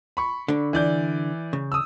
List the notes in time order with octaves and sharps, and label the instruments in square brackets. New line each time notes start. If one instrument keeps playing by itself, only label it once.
[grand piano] B5 C#6
[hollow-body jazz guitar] D3 D4
[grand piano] E3 D5 G6
[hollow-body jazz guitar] C#3
[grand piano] D#6 E6